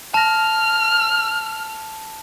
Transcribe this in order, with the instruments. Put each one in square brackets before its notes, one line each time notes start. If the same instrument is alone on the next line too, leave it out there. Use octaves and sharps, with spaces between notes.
[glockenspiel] A5 A#6 [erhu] F6